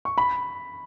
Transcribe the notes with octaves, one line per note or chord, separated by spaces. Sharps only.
C#6
B5